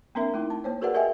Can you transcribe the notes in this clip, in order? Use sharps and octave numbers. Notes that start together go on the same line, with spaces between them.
A#3 C4 D4 A#4 E5
A3 D#4 E4
A5
A#3 C5 C#5
F#4 G#4 A#4 B4 D5 F#5
G4 A#4 D#5 E5 G5 G#5